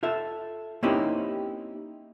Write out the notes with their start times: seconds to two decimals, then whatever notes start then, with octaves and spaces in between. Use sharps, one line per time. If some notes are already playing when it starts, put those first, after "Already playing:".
0.03 F4 A4 E5
0.83 A#3 C4 C#4 D#4 E4 G4